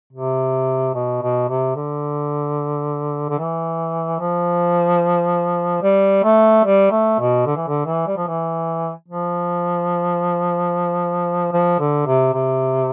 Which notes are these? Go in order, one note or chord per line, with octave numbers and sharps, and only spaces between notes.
C3
B2
B2
C3
D3
D3
E3
F3
G3
A3
G3
A3
B2
D3
E3
D3
E3
G3
F3
E3
F3
F3
D3
C3
C3